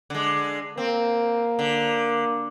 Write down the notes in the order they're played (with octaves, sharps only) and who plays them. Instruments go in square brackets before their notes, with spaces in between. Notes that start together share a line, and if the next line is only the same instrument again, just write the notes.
[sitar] D3 G#3
[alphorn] A#3 [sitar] C4
[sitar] D3